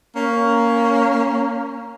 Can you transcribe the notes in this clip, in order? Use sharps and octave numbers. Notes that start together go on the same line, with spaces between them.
A#3 C#4